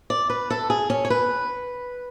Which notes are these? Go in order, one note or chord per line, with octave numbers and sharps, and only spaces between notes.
D5
B4
A4
G#4
C#4
C#5
B4